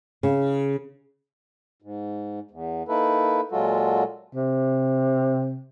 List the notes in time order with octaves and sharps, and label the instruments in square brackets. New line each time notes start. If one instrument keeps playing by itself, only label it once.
[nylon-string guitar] C#3
[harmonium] G#2
E2
A#3 D#4 E4 A4 B4
A#2 F#3 G#3 F4 F#4 A4
[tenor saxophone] C3